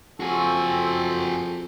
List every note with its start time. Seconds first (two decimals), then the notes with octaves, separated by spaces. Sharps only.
0.20 F2 C4 C#4 F#4 G#4 A4